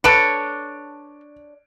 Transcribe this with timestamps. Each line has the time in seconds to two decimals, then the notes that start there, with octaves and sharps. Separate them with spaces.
0.04 D4 A4 B4 C#5 D7